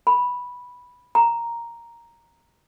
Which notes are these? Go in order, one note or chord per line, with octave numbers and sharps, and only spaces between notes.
B5
A#5